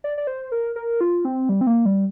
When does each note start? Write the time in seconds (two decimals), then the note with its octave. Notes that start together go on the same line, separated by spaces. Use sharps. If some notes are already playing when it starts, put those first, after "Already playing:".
0.04 D5
0.18 D5
0.27 C5
0.52 A#4
0.76 A#4
1.01 F4
1.25 C4
1.49 G3
1.61 C4
1.67 A#3
1.86 G3